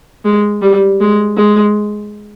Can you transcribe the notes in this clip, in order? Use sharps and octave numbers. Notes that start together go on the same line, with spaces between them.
G#3
G3
G#3
G#3